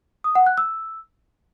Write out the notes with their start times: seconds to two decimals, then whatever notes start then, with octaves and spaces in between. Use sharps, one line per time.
0.24 D#6
0.35 F#5
0.46 F#6
0.58 E6